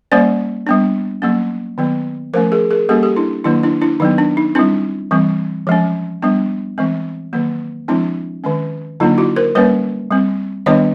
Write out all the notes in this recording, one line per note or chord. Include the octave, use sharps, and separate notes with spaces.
G3 A#3 C#4 C5 D5
G3 B3 D4
F#3 A#3 C#4
D#3 F#3 B3
F3 A3 C#4 A#4 C5
G#4 A#4
G#4 A#4
G3 A#3 C#4 G4 A4
G4 A4
D4 E4
D#3 F#3 A#3 D4 E4
D4 E4
D4 E4
D#3 F#3 B3 D#4
D4
D#4
G3 C4 D4 E4
E3 G3 C4
F3 G#3 C#4
G3 B3 D4
E3 G#3 C4
D#3 F#3 A#3
F3 G#3 C4 D4 E4
D#3 G#3 C#4
D3 F#3 A#3 D4 D#4 F4
E4 F#4
A#4 C5
G3 A#3 C#4 B4 C#5
G3 C4
D#3 G3 B3 D4 C#5 D#5